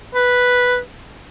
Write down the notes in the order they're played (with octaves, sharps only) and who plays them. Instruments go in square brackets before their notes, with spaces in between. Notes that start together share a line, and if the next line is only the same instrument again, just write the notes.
[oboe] B4